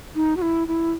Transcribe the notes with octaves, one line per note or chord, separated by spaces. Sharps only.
D#4
F#4
E4
E4